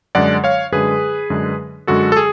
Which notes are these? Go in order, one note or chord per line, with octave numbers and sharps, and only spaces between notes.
F#2 D3 G#3 D5 F#5
C#5 F5
F#2 D3 G#3 G#4 B4
F#2 D3 G#3
F#2 D3 G#3 F#4 A4
A4
G#4